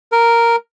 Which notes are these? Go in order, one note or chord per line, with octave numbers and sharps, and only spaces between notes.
A#4